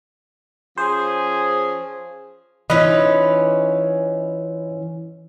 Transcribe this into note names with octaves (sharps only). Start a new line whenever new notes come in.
F3 C#4 G#4 C5
E3 C#4 D#4 F4 B4 D#5